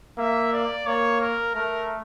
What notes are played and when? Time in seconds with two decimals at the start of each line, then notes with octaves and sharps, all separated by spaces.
0.18 A#3 E5
0.53 D5
0.86 A#3 C#5
1.21 A#4
1.55 A3 A#4